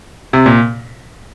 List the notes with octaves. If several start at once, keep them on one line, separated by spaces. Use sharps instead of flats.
C3
A#2